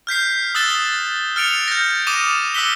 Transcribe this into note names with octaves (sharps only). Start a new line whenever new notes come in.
F6 G6 B6 C7
D#6 E6 F#6 A6 E7 G7
F6 A6 C#7 D7 F7
G6 A#6
D6 D#6 A#6 D#7 E7
D6 E6 F#6 B6 G7